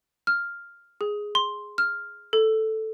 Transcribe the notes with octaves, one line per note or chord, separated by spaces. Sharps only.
F6
G#4
C6
F6
A4